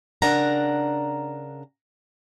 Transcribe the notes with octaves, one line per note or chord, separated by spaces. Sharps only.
C#3 D4 A#4 F#5 A#5